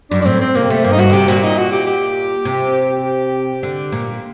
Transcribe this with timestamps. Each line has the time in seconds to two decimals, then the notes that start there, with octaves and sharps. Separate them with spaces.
0.11 F#2 D4
0.21 D4
0.26 A2 C4
0.41 C4
0.55 C3 A#3
0.70 C3 A3
0.84 G2 A#3
0.92 D#4
0.98 G2 F#4
1.10 D3
1.13 C3 G4
1.28 A#2 F#4
1.43 D#4
1.58 F#4
1.72 G4
1.87 G4
2.45 C3
3.04 G4
3.63 D3
3.92 A#2